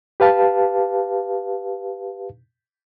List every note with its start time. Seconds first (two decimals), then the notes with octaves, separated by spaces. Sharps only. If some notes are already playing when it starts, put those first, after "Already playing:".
0.20 G4 B4 F5 A5